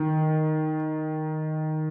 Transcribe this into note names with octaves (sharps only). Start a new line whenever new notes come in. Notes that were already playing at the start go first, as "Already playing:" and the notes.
Already playing: D#3